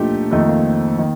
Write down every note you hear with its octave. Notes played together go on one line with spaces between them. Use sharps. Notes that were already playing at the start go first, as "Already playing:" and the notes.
Already playing: A#2 F3 A3 D4 D#4 G4
F2 D#3 A3 A#3 C4 D#4
A#3
D#3